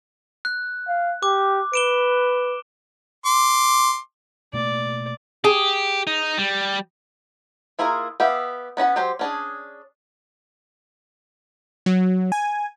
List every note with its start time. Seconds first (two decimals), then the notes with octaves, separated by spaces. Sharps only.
0.45 F#6
0.88 F5
1.23 G4 D6
1.74 B4 D7 E7 G7
3.25 C6 D6
4.53 B2 A3 A#3 D5
5.44 G4 G#4
6.07 D#4
6.37 G3
7.79 A#3 E4 F4 G#4 A#4
8.20 B3 G4 E5 F5
8.77 B3 C#4 D#5 F#5
8.96 F#3 G4 C5
9.19 C#4 D4 G#4
11.86 F#3
12.32 G#5